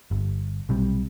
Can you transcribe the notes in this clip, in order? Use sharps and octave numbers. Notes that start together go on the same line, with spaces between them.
G1
B1 C3 G3